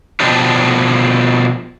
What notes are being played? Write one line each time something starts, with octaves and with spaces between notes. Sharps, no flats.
B2 F3 D4 G4